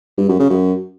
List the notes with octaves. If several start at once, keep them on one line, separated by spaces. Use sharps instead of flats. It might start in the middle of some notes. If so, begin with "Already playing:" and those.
G2
F#2
C#3
F#2